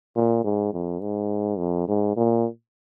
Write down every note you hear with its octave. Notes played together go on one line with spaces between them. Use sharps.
A#2
G#2
F2
G#2
F2
G#2
A#2